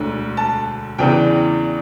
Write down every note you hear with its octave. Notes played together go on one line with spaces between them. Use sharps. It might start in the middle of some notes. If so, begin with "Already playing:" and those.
Already playing: E1 D2 D3
A5
E2 C#3 E3 B3 D4 G5